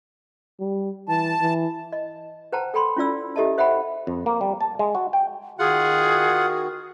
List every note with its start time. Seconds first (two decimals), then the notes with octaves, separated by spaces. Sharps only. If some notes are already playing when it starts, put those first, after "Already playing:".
0.60 G3
1.09 E3 A5
1.42 E3
1.92 D#5
2.53 B4 C5 F#5 G5 A5 A#5
2.74 A4 G5 B5 C6
2.96 C#4 E4 F4 D5 E6
3.36 E4 G4 A4 D#5 E5 A5
3.58 C5 E5 F#5 G5 B5
4.07 F2
4.26 A#3
4.41 G3
4.61 A5
4.79 G#3
4.95 F#4
5.13 G5
5.59 D#3 F4 F#4 G#4 F#5